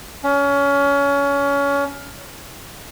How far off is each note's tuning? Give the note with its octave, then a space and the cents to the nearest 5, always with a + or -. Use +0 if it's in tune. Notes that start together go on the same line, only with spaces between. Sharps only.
C#4 +25